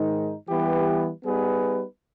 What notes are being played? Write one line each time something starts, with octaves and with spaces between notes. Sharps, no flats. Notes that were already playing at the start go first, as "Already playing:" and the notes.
Already playing: G#2 D#3 G#3 D#4
E3 G3 B3 G4 B4
G3 B3 D#4 G#4 B4